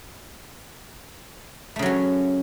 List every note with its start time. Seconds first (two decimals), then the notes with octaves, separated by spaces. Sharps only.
1.76 A3
1.79 C#3
1.82 F#3
1.86 C#4